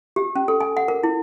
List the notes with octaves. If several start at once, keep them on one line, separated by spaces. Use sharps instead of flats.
G4
C#4
A4
G#5
F#5
A#4
E4